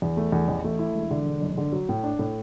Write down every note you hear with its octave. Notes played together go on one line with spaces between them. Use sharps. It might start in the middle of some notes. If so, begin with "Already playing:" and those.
E2
A3
E2
A1
A3
E4
E1
D3
E1
F#1
D3
F#3
A2
D4
A2